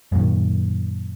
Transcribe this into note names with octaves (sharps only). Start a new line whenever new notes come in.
F#2 A#2 D#3